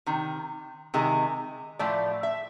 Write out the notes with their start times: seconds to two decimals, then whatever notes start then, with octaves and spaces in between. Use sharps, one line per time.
0.06 C3 D#3
0.94 C3 D#3 G#3
1.79 A2 F3 A3 D5
2.23 E5